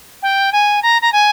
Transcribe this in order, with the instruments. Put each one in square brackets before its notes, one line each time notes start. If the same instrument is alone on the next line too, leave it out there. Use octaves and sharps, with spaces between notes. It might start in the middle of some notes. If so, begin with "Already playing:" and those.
[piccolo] G5
G#5
A#5
A#5
G#5